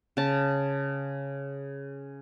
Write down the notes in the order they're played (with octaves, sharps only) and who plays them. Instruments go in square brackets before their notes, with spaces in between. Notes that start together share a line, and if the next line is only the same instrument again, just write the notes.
[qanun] C#3 A5